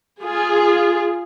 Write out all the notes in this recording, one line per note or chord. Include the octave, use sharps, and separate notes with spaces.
F4 G#4